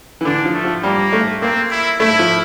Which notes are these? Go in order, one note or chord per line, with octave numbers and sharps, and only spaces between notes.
E3
D3 D4
F3
A3
F3
G3 A#3
A3
A#3 C4
E4
A3 E4
F3